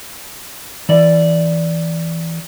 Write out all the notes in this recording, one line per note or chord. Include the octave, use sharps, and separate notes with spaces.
E3 D5